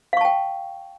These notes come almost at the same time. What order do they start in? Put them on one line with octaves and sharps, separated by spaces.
F5 C#6 A5 G5